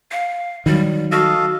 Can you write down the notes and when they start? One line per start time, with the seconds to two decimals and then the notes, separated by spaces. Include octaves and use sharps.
0.11 F5
0.66 D#3 F#3 G3
1.12 F#4 A4 D#5 F5